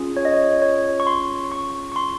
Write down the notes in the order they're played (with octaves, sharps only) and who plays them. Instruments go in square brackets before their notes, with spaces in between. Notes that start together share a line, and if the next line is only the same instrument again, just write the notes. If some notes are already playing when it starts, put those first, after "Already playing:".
Already playing: [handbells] C#4 F4 G#4
C#5
D#5
C#5
C#5
C#6
C6
C#6
C#6
C6